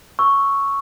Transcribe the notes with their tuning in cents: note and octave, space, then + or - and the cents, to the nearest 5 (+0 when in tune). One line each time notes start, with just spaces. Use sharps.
C#6 +0 E6 +0